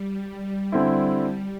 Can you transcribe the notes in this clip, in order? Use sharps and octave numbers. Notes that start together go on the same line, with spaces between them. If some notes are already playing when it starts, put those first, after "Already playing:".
Already playing: G3
D3 G3 C4 E4